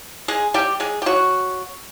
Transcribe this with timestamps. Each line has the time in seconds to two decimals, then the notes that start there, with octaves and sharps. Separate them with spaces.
0.28 G#3 G#4
0.54 G3 G4
0.80 G#3 G#4
1.02 G4
1.06 F#3 F#4